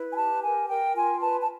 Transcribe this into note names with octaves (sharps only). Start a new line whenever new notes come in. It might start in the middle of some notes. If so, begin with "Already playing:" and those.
Already playing: E4 B4
G#5
G4 A5
A#4 G#5
A#4 G5
F4 G#5
B4 A5
A5